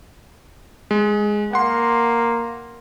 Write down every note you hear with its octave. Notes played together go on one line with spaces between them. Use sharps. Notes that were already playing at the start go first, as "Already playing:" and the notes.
G#3
A#3 F#5 C6